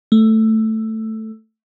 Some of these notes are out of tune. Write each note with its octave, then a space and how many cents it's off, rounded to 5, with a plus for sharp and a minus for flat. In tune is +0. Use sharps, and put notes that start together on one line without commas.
A3 +5